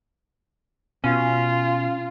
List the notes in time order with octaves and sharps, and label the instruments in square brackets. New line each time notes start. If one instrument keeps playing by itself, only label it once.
[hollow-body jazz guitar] B2 [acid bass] C#4 [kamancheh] F4